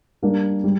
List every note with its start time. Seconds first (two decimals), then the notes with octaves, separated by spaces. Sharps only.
0.22 G3 A#3 D4
0.64 G3